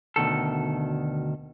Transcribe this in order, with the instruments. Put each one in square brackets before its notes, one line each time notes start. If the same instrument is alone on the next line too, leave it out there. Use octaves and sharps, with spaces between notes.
[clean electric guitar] D2 B2 D#3 A4